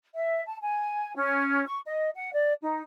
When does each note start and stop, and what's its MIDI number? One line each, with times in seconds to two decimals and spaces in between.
0.14 0.41 76
0.46 0.57 81
0.60 1.15 80
1.15 1.63 61
1.65 1.79 85
1.85 2.09 75
2.15 2.31 78
2.32 2.52 74
2.61 2.82 63